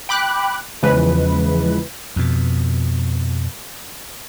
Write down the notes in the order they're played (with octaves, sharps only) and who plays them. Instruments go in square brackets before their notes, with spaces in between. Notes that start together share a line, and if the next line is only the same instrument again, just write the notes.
[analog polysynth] G5 B5 D6 F#6
E2 C#3 E3 F3 G#3 B4
[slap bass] F2 B2